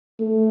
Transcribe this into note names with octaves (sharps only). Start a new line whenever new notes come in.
A3